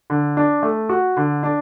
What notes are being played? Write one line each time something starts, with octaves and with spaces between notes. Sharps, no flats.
D3
D4
A3
F#4
D3
D4